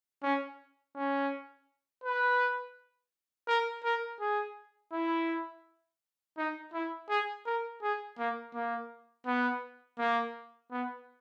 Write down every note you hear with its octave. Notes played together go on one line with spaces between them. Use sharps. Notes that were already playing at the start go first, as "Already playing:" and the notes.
C#4
C#4
B4
A#4
A#4
G#4
E4
D#4
E4
G#4
A#4
G#4
A#3
A#3
B3
A#3
B3